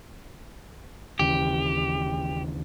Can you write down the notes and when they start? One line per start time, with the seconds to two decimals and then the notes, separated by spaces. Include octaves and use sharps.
1.19 D#2 C#3 E3 G4